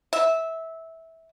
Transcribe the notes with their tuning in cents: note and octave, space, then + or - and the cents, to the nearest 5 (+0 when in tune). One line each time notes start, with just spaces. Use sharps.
E5 -15